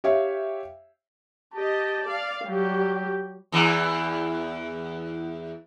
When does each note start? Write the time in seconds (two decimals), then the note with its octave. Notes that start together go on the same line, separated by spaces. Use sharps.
0.04 G4 C#5 E5 F5 G5
1.54 G4 D#5 A5
2.03 D5 F5
2.44 F#3 G3 G4 G5
3.52 E2 E3